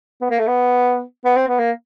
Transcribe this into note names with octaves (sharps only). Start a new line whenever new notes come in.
B3
A#3
A3
B3
B3
C4
B3
A#3